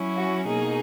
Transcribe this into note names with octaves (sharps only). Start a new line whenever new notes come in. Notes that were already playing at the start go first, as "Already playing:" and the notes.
Already playing: F#3 C#4 E4
F#4
B2 A#3 D#4 G#4